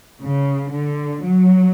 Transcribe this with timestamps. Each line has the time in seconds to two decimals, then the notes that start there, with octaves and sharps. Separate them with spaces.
0.22 C#3
0.72 D3
1.22 F#3